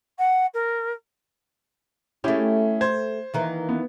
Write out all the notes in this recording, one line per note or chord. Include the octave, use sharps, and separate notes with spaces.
F#5
A#4
A3 C#4 E4 G4 G#4
C5 G#6
D#3 E3 A#3
B3